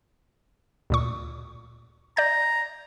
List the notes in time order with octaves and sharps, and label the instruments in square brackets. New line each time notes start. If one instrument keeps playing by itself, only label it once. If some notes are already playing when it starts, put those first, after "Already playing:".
[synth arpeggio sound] D2 A#2 C#6
[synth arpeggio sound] D5 G6 [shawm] A#5